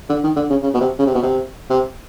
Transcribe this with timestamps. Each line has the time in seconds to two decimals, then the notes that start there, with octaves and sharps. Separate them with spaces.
0.10 D3
0.24 D#3
0.36 D3
0.50 C#3
0.63 C#3
0.74 B2
0.81 C3
0.99 C#3
1.07 C3
1.15 B2
1.23 C3
1.70 C3